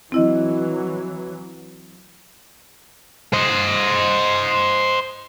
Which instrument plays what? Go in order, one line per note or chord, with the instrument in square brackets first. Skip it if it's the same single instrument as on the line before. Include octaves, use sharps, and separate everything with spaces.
[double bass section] E3 F#3 [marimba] C4 E4 D#5
[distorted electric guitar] C5 D#5